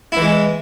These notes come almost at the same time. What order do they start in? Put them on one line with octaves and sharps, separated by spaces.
E4 E3 G#3